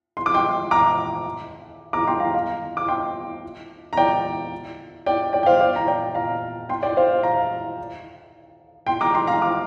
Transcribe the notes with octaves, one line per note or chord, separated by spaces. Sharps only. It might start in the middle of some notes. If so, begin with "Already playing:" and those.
C6
D6
G5 C6
A#5 D6
A#5 D6
G5 C6
F5 A#5
F5 A#5
D6
G5 C6
A#5
D5 G5
D5 G5
D5 G5
G5
C5 F5
D5
A#5
D5 G5
F5 A#5
G5 C6
D5 G5
C5 F5
F5 A#5
G5 C6
A#5 D6
G5 C6
F5 A#5
A#5 D6